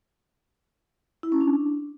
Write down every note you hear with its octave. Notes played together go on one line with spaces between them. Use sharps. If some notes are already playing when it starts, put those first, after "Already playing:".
E4
C#4
D4